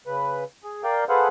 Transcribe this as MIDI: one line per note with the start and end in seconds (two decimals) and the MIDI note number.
0.07 0.44 49
0.07 0.44 71
0.64 0.83 68
0.84 1.04 70
0.84 1.04 74
0.84 1.04 77
0.84 1.04 79
1.09 1.28 68
1.09 1.28 69
1.09 1.28 71
1.09 1.28 72
1.09 1.28 77
1.09 1.28 78